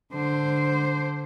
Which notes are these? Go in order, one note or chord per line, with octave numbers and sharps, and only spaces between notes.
D3 C5